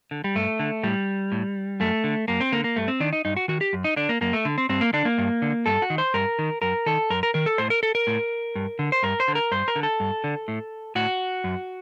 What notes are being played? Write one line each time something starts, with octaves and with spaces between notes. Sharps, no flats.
D3
G3
G2 A3
D3
A2 G3
A2
F#2 A3
D3
F#2 A#3
C4
D3 A#3
A#3
G2 A3
C4
D#3 D4
D#4
G2 D#4
F#4
D#3 F#4
G4
F#2
D#4
D3 D4
A#3
F#2 A#3
A3
D3
C4
G2 C4
A#3
D3 D4
A#3
G2
D3
G2 A4
F#4
D#3
C5
G2 A#4
D#3
F#2 A#4
D#3 A4
F#2 A#4
A#4
D#3 A#4
A4
A2 C5
A#4
A4
A#4
A2
G2
D3
C5
G2 A#4
C5
D3
A#4
G2 C5
A#4
D3
A4
G2
D3
A2
A2 F#4
F#2